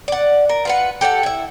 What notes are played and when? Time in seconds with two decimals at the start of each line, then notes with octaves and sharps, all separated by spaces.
0.08 D5 F#5
0.49 A#4
0.65 F4 B4 F#5
1.01 G4 A4 D5 F#5
1.23 E4 E5